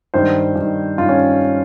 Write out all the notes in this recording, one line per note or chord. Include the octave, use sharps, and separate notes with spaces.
G2 D#3 C5
G2 D#3
G2 D#3 F4
C#4